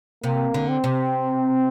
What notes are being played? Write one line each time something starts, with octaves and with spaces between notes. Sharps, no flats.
C3 A#3
D3
C4
C3